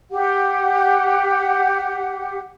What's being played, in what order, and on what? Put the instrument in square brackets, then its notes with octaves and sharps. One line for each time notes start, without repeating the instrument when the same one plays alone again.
[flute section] G4 F#5